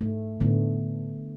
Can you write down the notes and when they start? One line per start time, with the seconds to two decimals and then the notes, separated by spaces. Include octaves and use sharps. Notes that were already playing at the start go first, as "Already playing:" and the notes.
0.01 G#2 A3
0.40 A2 D3 A3 B3 D#4